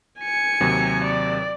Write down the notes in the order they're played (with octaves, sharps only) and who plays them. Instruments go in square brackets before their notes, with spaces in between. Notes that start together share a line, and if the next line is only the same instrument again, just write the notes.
[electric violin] G#5 C#7
[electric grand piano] D#2 C3 F#3
[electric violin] D5